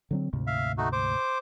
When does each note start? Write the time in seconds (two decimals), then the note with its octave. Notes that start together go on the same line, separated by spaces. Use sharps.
0.11 D3 F#3 C4
0.33 D2 G#2 C3
0.47 E5 F5
0.78 A3 D#4 F#4
0.93 C5 D6